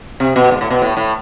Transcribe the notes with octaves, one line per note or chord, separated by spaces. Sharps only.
C3
B2
G#2
A2
B2
A2
A2